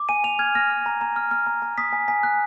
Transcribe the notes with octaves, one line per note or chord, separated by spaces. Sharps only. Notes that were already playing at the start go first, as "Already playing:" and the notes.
Already playing: D6
G#5 D#7
G#5 F7
F6 G#6
F6 A#6
F6
A#5
A#5
F6
F6
A#5
A#5
D#6 B6
G#5
G#5 B6
F#6